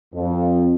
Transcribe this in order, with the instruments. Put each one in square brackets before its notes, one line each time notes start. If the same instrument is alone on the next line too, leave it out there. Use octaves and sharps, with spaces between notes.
[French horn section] F2